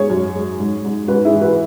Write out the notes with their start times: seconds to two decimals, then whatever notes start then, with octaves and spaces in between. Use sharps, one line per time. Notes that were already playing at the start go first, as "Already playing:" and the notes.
Already playing: G#2 G#4 C#5
0.10 F#2
0.35 G#3
0.59 G#2
0.85 G#2
1.08 G#2 F#4 B4
1.25 E4 G#4
1.33 E3
1.41 F#4 B4